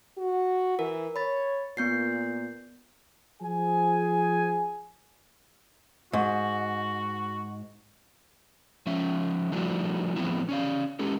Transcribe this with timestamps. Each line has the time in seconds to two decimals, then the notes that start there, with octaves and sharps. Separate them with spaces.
0.18 F#4
0.79 E3 A#4
1.16 C#5 B5 A6
1.77 A#2 B3 G6 C7
3.42 F3 G#4 G#5
6.13 G#2 F#4
8.86 F3 C#4 E5
9.52 F3 G3 A3 D4 E4 F#4
10.16 A2 F3 G#3 B3 C4 E4
10.49 C#4 D5 F5
10.99 G#3 C#4 G4 A4